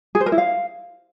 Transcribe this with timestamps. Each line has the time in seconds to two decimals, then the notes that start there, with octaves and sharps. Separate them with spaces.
0.15 G#4
0.21 C5
0.26 A#4
0.32 E4
0.38 F5